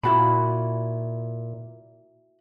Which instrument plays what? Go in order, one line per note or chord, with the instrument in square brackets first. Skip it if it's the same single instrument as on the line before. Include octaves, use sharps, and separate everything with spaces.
[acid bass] A#2 [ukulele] E4 F#4 B5